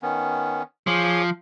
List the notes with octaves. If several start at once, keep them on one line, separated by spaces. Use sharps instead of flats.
D#3 B3 C#4
F3 G#4 C#5 D6